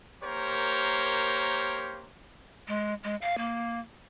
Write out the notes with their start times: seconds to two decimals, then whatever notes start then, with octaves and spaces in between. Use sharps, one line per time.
0.23 A#3 G4 A#4 C5 C#5
2.68 G#3
3.03 G#3
3.22 F5
3.38 A#3